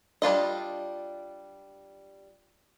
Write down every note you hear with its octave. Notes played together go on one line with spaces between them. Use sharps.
G3 D4 F4 D#5